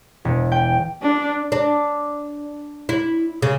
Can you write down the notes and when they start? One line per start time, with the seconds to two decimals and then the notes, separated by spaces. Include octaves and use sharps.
0.25 E1
0.52 G5
1.03 D4
1.52 D4
2.89 E4
3.42 C#3